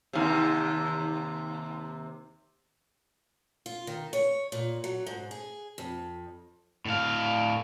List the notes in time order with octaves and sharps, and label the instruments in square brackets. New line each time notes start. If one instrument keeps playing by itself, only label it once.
[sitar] D#2 C3
[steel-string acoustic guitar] F4
D#3
C#5
A#2
F#3
G#2
G#4
F2
[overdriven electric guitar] A2 F5